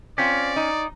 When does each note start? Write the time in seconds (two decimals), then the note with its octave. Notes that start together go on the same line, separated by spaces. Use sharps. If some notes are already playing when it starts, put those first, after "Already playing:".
0.18 C4 C#4 F4 D5
0.56 D#4